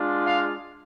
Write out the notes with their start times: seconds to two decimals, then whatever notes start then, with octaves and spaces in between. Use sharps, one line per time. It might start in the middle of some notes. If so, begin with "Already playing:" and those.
Already playing: G#3 D4 F4
0.25 F5